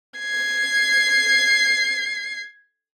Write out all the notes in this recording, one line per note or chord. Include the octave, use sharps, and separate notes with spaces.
G#6 C7